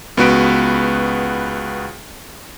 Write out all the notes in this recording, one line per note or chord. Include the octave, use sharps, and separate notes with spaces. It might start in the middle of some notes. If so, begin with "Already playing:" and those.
C#2 B3 F#4 B4 D7